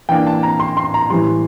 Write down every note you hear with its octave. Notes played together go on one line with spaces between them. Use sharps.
E3 A#3 D4 G5
A5
A#5
C6
C6
A#5
A2 E3 G3 C6